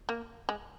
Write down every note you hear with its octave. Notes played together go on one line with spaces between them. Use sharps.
A#3
G#3